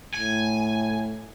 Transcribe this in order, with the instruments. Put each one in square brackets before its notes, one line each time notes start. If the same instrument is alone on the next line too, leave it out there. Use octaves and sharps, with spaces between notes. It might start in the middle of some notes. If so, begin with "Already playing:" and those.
[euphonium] A2 [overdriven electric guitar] G#5